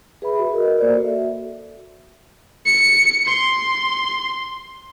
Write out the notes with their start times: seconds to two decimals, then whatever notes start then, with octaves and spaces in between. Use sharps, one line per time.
0.22 G#4 B4 E5 B5
0.39 F#4
0.51 F#4 A#4 D#5
0.79 A#3 C5 D5
0.93 F#4 A4
1.05 E5
2.66 C#7
3.26 C6